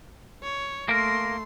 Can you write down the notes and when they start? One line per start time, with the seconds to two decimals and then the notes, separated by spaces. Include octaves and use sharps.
0.43 C#5
0.89 A3 A#3 A#4 C6